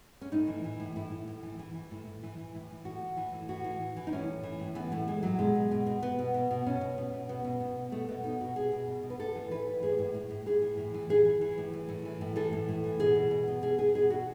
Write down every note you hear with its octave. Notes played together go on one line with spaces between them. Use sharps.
C#4
A2 D#4
E3
E3
A2
A2 E4
A2
A2
E3
E3
E3
A2
A2
E3
E3
A2
E3
A2 F#4
A2
E3
A2
A2 F#4
E3
E3
E3
D#4
A2 C#4
A2
E3
A2
E3 B3
A2 A3
E3 G#3
A2 F#3
B2 G#3
B2
B2
B2
B2 B3
B2
B2
B2
B2 C#4
B2
B2
B2
B2 B3
B2
B2
B2
B2 A3
B2 B3
B2 D#4
B2 F#4
B2 G#4
B2
B2
B2
B4
A2 A4
E3
E3 B4
A2
A2 G#4
A2
A2
A2
A2 G#4
E3
A2
E3
E3 G#4
E3
E3
A2
E3
A2
E3
A2
E3 A4
A2
A2
E3
B2 G#4
B2
B2
B2
B2 G#4
B2 G#4
B2 G#4
B2 F#4